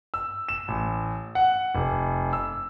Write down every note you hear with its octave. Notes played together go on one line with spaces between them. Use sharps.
E6
E7
A1
F#5
F1
E6